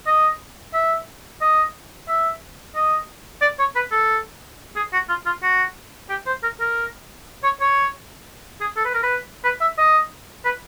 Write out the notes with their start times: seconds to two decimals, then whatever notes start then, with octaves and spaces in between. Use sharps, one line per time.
0.07 D#5
0.74 E5
1.41 D#5
2.08 E5
2.76 D#5
3.41 D5
3.59 C#5
3.76 B4
3.91 A4
4.76 G#4
4.93 F#4
5.09 F4
5.26 F4
5.43 F#4
6.09 G4
6.26 C5
6.43 A#4
6.60 A#4
7.44 C#5
7.61 C#5
8.61 G#4
8.77 A4
8.85 B4
8.94 A#4
9.03 B4
9.44 B4
9.61 E5
9.78 D#5
10.45 B4